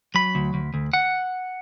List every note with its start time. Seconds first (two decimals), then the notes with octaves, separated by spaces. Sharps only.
0.15 F#3 B5
0.35 D2
0.54 D2
0.74 D2
0.93 F#5